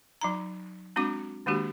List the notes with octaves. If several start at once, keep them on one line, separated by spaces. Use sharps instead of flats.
F#3 D#4 A#5
G#3 C4 D4 F#4 D6
D#3 G#3 A#3 D4 F#4 G4